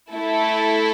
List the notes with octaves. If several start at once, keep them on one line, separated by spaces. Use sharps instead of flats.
A3 E4 A4